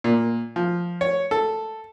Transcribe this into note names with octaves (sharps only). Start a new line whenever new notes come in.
A#2
F3
C#5
A4